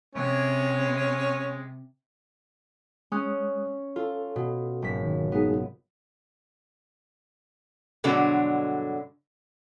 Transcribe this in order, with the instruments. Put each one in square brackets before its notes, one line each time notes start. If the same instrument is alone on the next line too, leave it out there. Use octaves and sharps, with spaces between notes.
[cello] C3 [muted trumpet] G#3 [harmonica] C#4
[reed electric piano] G#3 D#6 F#6 [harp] C#4
[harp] F4 [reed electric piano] A4
[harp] B2
F#1 G#2 B6
[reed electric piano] D#3
[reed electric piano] G#3 D#4 G#4 [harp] B3
[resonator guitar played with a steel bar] G2 B2 D3 F#3 G#3 D4